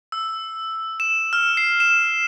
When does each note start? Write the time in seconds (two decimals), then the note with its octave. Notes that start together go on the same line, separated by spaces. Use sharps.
0.12 E6
1.00 E7
1.33 F6
1.57 C7
1.80 E7